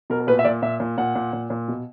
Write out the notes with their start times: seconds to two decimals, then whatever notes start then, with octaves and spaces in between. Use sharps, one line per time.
0.10 B2 A#4
0.20 A#4
0.27 A#2 B4
0.39 E5
0.45 A#2 D5
0.62 A#2 E5
0.80 A#2
0.98 A#2 F#5
1.15 A#2
1.33 A#2
1.50 A#2
1.68 B2